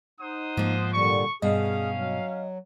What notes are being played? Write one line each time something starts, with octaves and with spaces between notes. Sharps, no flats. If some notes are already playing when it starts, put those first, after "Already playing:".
D#4 C5 F#5 D#6
G#2 F3 A#3
A#2 D3 G3 C#6
G2 B2 C#4 G#4 D#5 F5
F#3